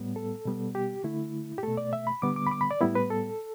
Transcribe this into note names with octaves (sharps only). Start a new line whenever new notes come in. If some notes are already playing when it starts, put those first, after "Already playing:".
Already playing: A2 G3 B3
A4
B2 G3 B3
G4
D3 A3 E4
G4
B2 A3 A4
D5
E5
B5
D3 G3 B3 D6
D6
B5
D6
B5
D5
A2 G3 B3 E4
B4
A4